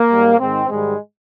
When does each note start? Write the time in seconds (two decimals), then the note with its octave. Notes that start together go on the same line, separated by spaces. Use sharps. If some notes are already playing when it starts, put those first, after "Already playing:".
Already playing: A#3
0.08 G#2 G3
0.38 G#2 D#3 G#3 C4
0.69 G#2 D#3 G3 G#3